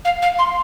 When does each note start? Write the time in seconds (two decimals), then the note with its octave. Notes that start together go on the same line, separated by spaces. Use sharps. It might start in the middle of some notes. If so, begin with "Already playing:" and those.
0.05 F5
0.22 F5
0.38 C6